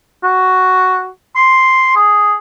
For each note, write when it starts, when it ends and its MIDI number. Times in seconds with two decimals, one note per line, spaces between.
0.24 1.08 66
1.36 1.91 84
1.96 2.35 68